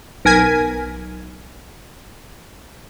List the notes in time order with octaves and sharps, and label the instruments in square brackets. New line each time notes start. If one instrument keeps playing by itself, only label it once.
[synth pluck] B1 A#4 G#5 G#6 B6